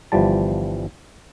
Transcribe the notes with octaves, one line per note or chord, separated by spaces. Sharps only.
G1 E3 F3 G3 A5